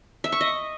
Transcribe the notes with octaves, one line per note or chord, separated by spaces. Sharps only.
E5
C#6
D#5